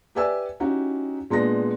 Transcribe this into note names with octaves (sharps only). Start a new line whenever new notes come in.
G4 B4 D5 E5 G#5 E6
C#4 D#4 E4 F#4 G4
A#2 G#3 B3 D4 A#6